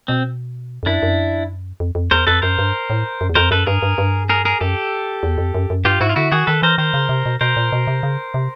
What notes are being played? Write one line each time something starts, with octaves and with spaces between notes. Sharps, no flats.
B2 C4
F2
F#2 D4 E4
F#2
F2
F2
E2 A#4 C5
F2 A4 B4
F#2 A#4 C5
G2
A2
F#2
E2
F2 A#4 C5
F#2 A4 B4
G2 G#4 A#4
G2
G2
G#4 A#4
G#4 A#4
F#2 G4 A4
E2
F2
F#2
F#2
G2 F4 G4
G#2 E4 F#4
F4
D3 E4 F#4
D#3 F#4 G#4
D#3 A4 B4
E3 A#4 C5
D#3 A#4 C5
C#3
C3
B2
B2 A#4 C5
A#2
B2
C3
C#3
C3